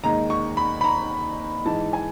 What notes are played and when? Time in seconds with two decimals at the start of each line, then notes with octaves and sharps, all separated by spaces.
0.04 D#2 D#3 G#3 A#5
0.30 C#6
0.57 B5
0.81 B5
0.84 A#5
1.65 G#2 E3 G#3 A5
1.93 G#5